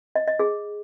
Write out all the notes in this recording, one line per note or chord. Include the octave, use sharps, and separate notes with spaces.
D#5
D#5
G#4